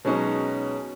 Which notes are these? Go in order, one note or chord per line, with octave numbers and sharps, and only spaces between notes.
B2 F#3 G#3 C#4 D#4